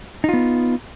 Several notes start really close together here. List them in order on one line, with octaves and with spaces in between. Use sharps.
D#4 F4 B3